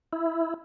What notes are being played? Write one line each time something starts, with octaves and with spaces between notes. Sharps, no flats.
E4